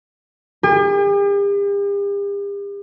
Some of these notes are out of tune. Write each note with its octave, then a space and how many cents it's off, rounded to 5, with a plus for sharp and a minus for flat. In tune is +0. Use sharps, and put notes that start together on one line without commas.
G4 +45